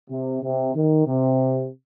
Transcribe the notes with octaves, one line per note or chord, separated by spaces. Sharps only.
C3
C3
D#3
C3